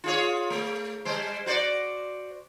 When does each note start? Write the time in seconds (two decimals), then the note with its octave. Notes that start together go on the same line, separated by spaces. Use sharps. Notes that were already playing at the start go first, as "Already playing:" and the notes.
0.04 F4 G#4 C#5
0.50 A3
1.05 G3 C5
1.46 F#4 C5 D5